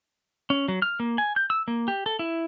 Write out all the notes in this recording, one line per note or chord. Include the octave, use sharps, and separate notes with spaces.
C#4
F#3
F6
A#3
G#5
G6
E6
A#3
G4
A4
E4